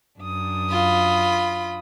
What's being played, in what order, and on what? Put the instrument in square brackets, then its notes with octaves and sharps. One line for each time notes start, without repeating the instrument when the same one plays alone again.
[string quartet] F#2 D4 D#6
[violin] F4 B5